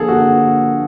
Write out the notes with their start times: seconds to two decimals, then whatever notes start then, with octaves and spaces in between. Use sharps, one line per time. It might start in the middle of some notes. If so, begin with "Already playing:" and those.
Already playing: D3 F3 A#3 G#4 A4
0.08 F#4